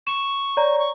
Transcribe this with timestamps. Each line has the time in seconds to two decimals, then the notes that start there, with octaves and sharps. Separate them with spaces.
0.07 C#6 E7
0.57 C#5 D5 A#5
0.79 C#6